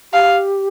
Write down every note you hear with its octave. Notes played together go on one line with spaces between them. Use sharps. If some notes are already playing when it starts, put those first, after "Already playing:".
G4 F5